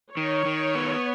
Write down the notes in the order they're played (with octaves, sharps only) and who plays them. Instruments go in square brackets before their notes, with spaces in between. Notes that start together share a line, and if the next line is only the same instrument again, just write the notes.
[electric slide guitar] D#3 [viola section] C#5
[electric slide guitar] D#3
B3